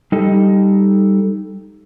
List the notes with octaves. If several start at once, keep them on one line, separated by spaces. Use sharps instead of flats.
G3 D#4 A4